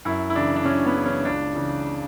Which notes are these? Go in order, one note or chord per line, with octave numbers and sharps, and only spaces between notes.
F#2 E4
E4
C#3 E3 D4
D4
F#2 C#4
B3
C#3 E3
C#4
C#2 D4
C#3 E3